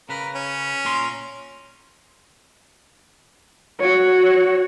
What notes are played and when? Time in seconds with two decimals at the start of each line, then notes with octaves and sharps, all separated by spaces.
0.09 C#3 A#4 B4
0.35 C#4
0.85 A#2 A#4 C6
3.80 F#4 C#5